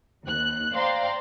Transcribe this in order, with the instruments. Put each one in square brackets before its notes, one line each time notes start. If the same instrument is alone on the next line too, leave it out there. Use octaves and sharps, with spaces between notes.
[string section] D#2 F#6
C5 D5 F5 G5 A#5 C6